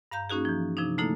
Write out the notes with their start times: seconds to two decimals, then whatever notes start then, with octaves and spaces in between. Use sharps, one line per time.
0.11 G2 F5 A#5 G6
0.30 A#3 C#4 D#4 F#4 G#4
0.45 E3 F3
0.77 C3 F3 D4 D#4
0.98 D3 A3 A#3 D#4 E4 A4